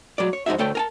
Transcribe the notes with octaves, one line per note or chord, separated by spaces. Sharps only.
F#3 G#3 D5
C#5
F2 G#3 D#4 F#4 E5
D2 A3 A4 C#5 G5
A#4 G#5 A5